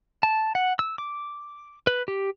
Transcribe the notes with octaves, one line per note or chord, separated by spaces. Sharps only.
A5
F#5
E6
D6
B4
G4